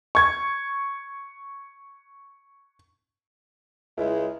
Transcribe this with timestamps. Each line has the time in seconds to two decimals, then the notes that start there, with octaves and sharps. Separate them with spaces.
0.15 C#6 G#6
3.98 C#2 G#3 E4